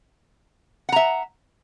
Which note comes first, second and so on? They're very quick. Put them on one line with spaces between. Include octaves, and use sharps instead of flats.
F#5 A#5 E5